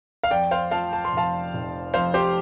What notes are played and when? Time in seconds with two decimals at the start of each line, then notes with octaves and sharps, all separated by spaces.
0.23 F5
0.31 F2 D5 G5
0.51 C5 F5
0.71 F3 F5 A5
0.93 A5
1.05 C6
1.13 F1 F5 A5
1.54 F1
1.94 F2 C5 F5
2.14 G4 C5